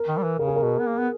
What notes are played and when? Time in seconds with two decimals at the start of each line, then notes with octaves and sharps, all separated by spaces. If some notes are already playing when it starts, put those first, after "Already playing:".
Already playing: A#4
0.08 D#3
0.17 G3
0.23 E3
0.39 C#3 A#4
0.47 G#4
0.56 A#4
0.63 B2
0.79 B3
0.86 A#3
0.98 B3